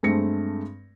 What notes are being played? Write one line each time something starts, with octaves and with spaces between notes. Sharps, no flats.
G2 G#3 A3 C4 A#6 C#7